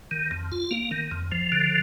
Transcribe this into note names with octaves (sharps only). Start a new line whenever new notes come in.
D#3
F2
F4
A#3
D#3
F2
F3
D3